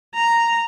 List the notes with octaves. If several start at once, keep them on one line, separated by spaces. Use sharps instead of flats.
A#5